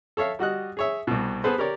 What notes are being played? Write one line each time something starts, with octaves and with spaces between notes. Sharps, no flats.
A4 C#5 E5 F5
G3 F#4 D#5 F#6
G#4 C#5 E5
C2 B2
B3 G#4 A4 B4 C5
G4 A#4 C#5 D5